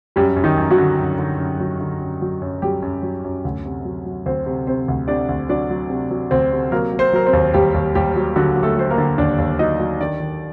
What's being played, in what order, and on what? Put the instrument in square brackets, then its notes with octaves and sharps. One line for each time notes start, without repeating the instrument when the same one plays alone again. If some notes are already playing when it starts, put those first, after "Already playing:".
[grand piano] F#2 G3 G4
F#2
D#3 D#4
F#2
F#3 F#4
D3
F#2
D3
F#2
F#3
D3
F#2
F#3
F#2
F#3 G3 G4
F#2
F#3
F#2
D2
C3
F#3
F#3
D2 C4 C5
C3
C3 C4 C5
D2
C3 D4 D5
D2
F#3 D4 D5
F#3
C3
F#3
D2 C4 C5
C3
F#3 A#3 A#4
F#3
C4 C5
F#3 A#4
C4 C5
D#2
D#2 G3 G4
D#2
D#2 G3 G4
F#3
D3 F#3 F#4
F#3
A3 A4
F#3 C5
A#3 A#4
D3
D#2 D4 D5
D#2
F#3 D#4 D#5
F#3
D#3 D4 D5
D#3